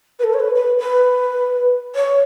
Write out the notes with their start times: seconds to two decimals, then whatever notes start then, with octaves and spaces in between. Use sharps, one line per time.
0.19 B4
0.23 A4
0.33 C#5
0.39 B4
0.55 B4
0.78 B4
1.95 C#5